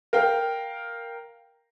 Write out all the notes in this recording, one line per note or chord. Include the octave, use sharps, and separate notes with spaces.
A#4 F5 G5